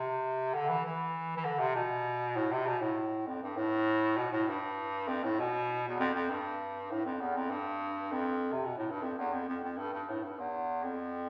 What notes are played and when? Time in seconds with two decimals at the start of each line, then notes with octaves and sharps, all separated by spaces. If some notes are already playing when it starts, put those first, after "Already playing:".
Already playing: C3
0.54 D3
0.69 E3
0.85 E3
1.37 E3
1.45 D3
1.60 C3
1.75 B2
2.36 A2
2.52 C3
2.67 B2
2.81 A2
3.27 F2
3.43 G2
3.57 A2
4.17 B2
4.32 A2
4.48 G2
5.08 F2
5.24 A2
5.39 B2
5.88 E2
5.99 F2
6.15 F2
6.30 G2
6.91 A2
7.05 F2
7.20 E2
7.36 F2
7.51 G2
8.12 F2
8.52 C3
8.65 B2
8.77 A2
8.90 G2
9.03 F2
9.18 E2
9.33 F2
9.49 F2
9.63 F2
9.78 G2
9.94 G2
10.09 A2
10.23 G2
10.39 E2
10.84 F2